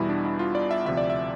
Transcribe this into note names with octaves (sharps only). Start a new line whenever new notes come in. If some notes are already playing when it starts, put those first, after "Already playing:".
Already playing: E2 B2 G3 E4
D4
E4
F4
D5
E5
D2 C3 F3 E5
D5
E5